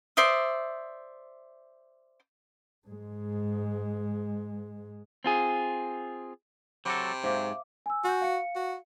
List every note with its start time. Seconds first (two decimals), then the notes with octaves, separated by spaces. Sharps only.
0.17 C5 D5 E5 D#6
2.87 G#2 G#3
5.24 C4 F4 G#4
6.86 C3 F#3 F#4 A4 B5 D6
7.24 G#2 F#3 C5 E5 F5 D6
7.86 G#5 E6
8.04 F#4 G#5 G6
8.21 F5 C#7
8.56 F#4